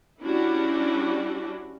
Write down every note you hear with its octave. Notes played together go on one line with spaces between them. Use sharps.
G3 C#4 D4 E4 F#4